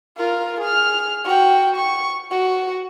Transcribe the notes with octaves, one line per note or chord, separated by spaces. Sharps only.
F4 A#4
G#4 F6
F#4 G5
C#6
F#4